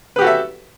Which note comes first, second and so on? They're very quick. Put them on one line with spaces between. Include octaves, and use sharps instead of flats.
B4 G4 F#4 A4 E5